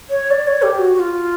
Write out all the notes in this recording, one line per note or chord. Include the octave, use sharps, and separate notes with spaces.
C#5
D5
C#5
G4
F#4
F#4
F4